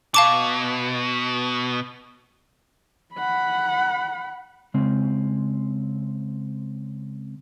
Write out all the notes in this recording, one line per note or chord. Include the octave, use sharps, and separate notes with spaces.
B2 F5 A5 D6
F#5 B5
C#3 G#3 C4